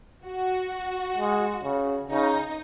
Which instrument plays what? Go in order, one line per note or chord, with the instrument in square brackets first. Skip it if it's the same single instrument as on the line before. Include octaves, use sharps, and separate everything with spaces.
[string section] F#4
[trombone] G#3
C#3
[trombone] C#3 [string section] D#4